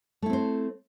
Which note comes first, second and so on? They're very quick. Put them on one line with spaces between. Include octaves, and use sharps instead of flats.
A3 E4 C4 C5